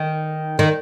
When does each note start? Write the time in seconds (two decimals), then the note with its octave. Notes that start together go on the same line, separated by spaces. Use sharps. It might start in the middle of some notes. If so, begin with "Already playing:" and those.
Already playing: D#3
0.59 D#3